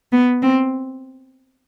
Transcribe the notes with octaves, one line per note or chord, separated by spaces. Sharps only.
B3
C4